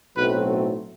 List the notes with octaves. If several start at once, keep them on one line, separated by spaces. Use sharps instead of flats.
B1 A2 F#3 A3 C4 B4